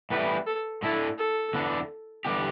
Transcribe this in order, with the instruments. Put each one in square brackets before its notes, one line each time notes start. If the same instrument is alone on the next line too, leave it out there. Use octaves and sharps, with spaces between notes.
[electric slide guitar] A2 E3 G3 B3 E4 [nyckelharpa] B4
[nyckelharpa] A4
[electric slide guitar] A2 A3 D4 A4 [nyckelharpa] E4
[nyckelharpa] A4
[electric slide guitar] E2 D3 B3 D4
E2 D3 G3 B3 G4